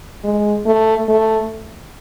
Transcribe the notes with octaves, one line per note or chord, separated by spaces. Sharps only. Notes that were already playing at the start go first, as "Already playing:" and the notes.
G#3
A3
A3